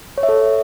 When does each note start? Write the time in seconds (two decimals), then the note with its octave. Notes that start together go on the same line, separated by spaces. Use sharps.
0.18 C#5
0.23 E5
0.29 A4